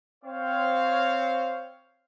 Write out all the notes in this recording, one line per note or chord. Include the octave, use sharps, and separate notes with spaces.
C4 C5 C#5 F5